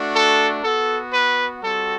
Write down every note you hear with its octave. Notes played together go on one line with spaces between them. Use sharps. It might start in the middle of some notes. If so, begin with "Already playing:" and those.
Already playing: A3 D4 F#4
A4
B3 F#4 A4
B4
G3 C4 F#4 A4